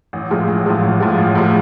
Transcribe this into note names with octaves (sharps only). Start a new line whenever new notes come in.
A1
A2 F3 G#3
A1
A2 F3 G#3
A1
A2 F3 G#3
A1
A2 F3 G#3